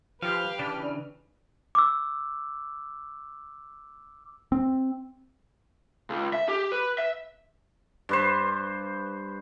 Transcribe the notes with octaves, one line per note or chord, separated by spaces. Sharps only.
F3 G4 B4 F5 F6
C#3 E3 D4
D6 E6
C4
C#2
E5
G4
B4
E5
G2 B4 C5